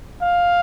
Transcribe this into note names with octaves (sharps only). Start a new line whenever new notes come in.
F5